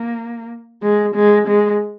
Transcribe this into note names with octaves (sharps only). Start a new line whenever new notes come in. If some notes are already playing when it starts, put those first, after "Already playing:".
Already playing: A#3
G#3
G#3
G#3